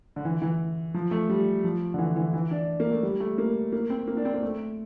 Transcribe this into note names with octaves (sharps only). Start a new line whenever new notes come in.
D3
E3
E3
F3
A3
G3
F3
D3
E3
E3
E3
D4
A#3
A3
G3
A3
A#3
A#3
C4
A#3
D4
C4
A#3
A3